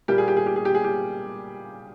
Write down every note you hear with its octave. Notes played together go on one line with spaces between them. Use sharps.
A#2 G3 A#3 G4
G#4
G4
G#4
G4
G#4
G4
G#4
G4